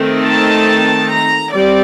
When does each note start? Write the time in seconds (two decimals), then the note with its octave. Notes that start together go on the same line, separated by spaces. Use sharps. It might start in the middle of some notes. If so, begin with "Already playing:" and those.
Already playing: D#3 A3 C4 D#4
0.23 A5
1.09 A#5
1.52 G3 C4 D5